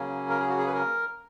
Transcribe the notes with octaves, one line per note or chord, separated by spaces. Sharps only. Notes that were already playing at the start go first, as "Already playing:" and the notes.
Already playing: C#3 F#3 A#3 C#4
A#4
G#4
F#4
G#4
B4
A#4